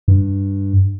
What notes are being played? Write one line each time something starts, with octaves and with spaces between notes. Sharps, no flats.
G2